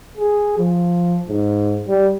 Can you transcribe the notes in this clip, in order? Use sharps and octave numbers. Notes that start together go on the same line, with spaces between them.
G#4
F3
G#2
G3